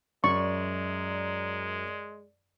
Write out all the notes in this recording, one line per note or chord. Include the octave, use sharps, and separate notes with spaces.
F#2 G#3 D5 C#6